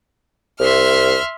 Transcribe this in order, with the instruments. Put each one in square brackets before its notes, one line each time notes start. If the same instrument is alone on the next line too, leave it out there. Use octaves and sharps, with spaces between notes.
[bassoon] C2 [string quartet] E5 C6 F6